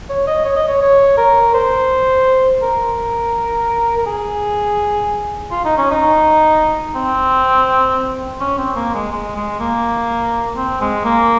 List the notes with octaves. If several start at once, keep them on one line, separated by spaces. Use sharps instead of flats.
C#5
D#5
C#5
D#5
C#5
C#5
A#4
C5
A#4
A#4
G#4
F4
D#4
C#4
D#4
C4
C#4
C4
A#3
G#3
G#3
G#3
A#3
C4
G#3
A#3